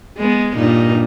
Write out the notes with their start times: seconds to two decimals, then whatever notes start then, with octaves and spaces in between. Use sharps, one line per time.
0.18 G#3 B3
0.57 G2 A#2 D#4